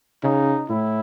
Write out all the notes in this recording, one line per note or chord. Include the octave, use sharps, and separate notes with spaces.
C#3 D#4
A2 E4